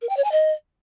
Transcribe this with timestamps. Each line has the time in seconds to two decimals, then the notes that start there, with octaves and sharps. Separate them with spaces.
0.02 A#4
0.09 G5
0.17 C#5
0.24 G#5
0.32 D#5